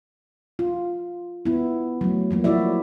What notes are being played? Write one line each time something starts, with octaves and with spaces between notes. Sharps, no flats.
F4
B3 E4
F#3 A3
F3 F#3 A#3
E4 F#4 D5 E5